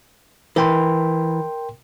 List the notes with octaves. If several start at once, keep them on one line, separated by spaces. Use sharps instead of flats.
E3 A#4 G5 C6